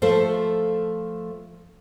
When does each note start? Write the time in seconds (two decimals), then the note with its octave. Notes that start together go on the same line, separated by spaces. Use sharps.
0.02 F3 A3 F4 A4 C5